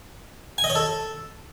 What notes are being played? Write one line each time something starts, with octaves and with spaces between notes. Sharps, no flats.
G#5
D#5
C#5
A4